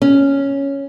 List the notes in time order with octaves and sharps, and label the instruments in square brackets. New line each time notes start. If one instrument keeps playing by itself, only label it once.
[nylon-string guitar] C#4